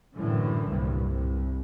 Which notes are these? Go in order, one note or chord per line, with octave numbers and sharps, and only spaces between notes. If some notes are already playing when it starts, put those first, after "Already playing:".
F#2 A2 D3 E3
C2 G2 A#2
C2